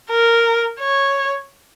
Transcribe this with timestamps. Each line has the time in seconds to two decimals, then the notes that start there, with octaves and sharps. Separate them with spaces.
0.11 A#4
0.79 C#5